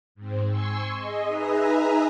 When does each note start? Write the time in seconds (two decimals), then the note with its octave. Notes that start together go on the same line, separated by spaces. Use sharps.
0.15 G#2 C4
0.48 G#5 C6 C#6 E6
0.95 G#4 D#5
1.27 D#4 G#4 B4 E5 G#5 A#5